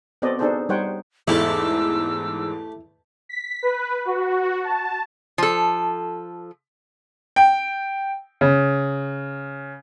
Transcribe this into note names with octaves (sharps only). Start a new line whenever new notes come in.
B3 C4 F#4 A4 D5 D#5
B3 D4 D#4 G#4 A4 C5
G3 D#4 C5 C#5 F#5 G5
E2 G#2 A3 E4 G4 F5 A5 E6
B6
B4
F#4
A5
F3 A4
G5
C#3